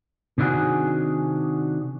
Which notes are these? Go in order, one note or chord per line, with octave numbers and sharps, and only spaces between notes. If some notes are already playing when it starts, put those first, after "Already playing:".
C3 D#3 D4 E4 F#4 G#4